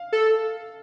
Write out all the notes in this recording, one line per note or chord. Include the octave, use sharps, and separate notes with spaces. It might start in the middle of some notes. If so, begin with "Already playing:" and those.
Already playing: F5
A4